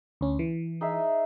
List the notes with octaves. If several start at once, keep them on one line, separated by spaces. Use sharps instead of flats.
D2 C#4
E3
D#4 G#4 E5